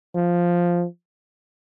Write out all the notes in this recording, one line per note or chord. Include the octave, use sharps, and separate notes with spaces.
F3